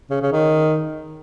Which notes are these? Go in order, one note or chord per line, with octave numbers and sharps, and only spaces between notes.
C#3
C#3
D#3